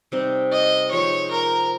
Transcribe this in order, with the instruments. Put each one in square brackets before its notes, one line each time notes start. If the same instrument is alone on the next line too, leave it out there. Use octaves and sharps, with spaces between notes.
[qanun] C3 G3 C4 D#4
[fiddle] D#5
[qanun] F3 G#3 D#4 [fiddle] C#5
[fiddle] A#4